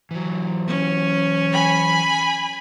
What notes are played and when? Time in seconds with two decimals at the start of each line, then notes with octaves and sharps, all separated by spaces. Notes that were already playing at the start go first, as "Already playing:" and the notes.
0.11 E3 F#3
0.67 C#4
1.53 G#5 B5